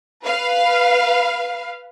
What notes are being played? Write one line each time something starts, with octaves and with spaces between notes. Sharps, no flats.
B4 F5